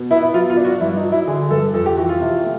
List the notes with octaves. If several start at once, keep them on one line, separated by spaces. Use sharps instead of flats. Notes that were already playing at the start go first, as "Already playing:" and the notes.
Already playing: B2
B3 E4
E4
F#3 F4
F4
D4
F#4
G2 E4
D#4
F#3
E4
D3 G#4
G2 A4
F2 A4
G4
E3 F#4
F4
C3
A3